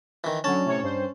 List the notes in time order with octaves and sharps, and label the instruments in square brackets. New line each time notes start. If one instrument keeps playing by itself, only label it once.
[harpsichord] D#3 E3
[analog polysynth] D3 F#3 [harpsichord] C#4 A5
[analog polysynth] A2 C3 C#5
G2 C5